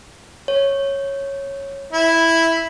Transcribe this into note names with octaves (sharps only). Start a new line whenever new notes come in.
C#5
E4